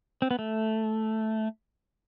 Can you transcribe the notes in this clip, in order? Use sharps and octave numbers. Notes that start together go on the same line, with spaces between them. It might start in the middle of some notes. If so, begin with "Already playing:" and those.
C4
B3
A3